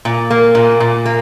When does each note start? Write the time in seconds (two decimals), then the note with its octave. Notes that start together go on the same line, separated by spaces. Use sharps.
0.05 A#2
0.31 A#3
0.55 A#2
0.80 A#2
1.06 A#3